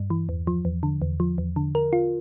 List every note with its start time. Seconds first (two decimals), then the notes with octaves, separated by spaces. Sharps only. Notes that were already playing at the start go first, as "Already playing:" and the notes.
Already playing: G2
0.10 E3
0.29 E2
0.47 F3
0.65 E2
0.83 D3
1.02 E2
1.20 F3
1.38 E2
1.56 D3
1.75 A#4
1.93 F4